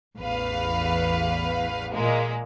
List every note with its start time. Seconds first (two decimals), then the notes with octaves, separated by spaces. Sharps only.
0.18 A1 E2 B4 F5
1.93 A#2 G#3 A#3